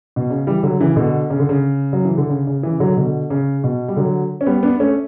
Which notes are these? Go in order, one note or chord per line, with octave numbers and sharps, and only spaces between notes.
B2
C#3
E3 G3
D3 F#3
C#3 E3
B2 D3
C#3
D3
C#3
F#3
E3
D3
C#3
C#3
C#3 E3
D3 F#3
B2 D3
C#3
B2
G3
D3 F#3
C#4
G3 B3
B3 D4
A3 C#4